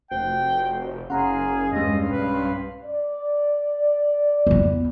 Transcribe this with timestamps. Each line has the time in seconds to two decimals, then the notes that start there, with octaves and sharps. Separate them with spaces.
0.11 F1 F#4 C5 G5
1.10 F#1 C#4 G#4 F5 F#5 A#5 C6
1.72 E2 G2 G#3 D#5
2.09 B1 B4
2.85 D5
4.47 F2 B3